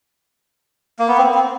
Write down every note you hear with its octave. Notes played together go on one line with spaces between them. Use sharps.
A#3
B3
C4
C4